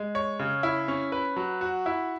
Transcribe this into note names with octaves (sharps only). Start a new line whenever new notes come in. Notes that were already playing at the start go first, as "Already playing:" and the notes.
Already playing: G#3
C#5
C#3
E4
C#4
B4
F#3
F#4
E4